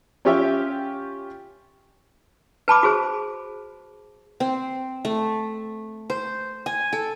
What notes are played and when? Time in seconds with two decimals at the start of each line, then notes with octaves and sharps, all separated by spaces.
0.25 C#4 F4 G4 C#5 E5 G5
2.68 B4 A5 B5 D6
2.83 F#4 G#4 C5
4.40 C4
5.05 A3
6.10 C5
6.66 G#5
6.93 A4